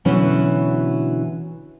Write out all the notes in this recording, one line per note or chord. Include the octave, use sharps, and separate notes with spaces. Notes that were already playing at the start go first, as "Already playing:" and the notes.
B2 D3 E3 F#3 C#4